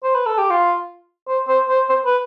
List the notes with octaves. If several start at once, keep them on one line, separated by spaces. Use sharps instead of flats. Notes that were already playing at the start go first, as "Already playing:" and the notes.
C5
B4
A4
G4
F4
C5
C5
C5
C5
B4